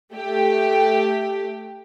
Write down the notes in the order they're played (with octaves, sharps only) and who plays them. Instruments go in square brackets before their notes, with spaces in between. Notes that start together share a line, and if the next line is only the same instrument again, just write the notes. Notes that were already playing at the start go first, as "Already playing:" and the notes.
[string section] A3 G4